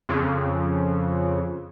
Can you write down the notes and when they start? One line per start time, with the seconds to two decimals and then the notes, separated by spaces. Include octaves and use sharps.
0.09 F2 C#3